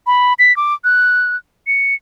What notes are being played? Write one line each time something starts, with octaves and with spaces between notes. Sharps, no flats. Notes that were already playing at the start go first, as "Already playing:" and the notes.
B5
B6
D6
F#6
C#7